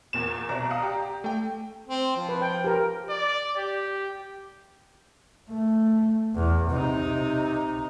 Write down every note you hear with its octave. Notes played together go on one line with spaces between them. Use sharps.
E2 A#2 E7
C2 B2 D5 A#5
F5 F#5 D#6
G4
A3 G5
C4
F3
B4
G5
G4 A#4
D5
G4
A3
E2
C3 D#4